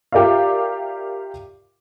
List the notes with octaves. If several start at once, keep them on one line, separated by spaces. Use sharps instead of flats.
F4 G4 A#4 D5 E5 F5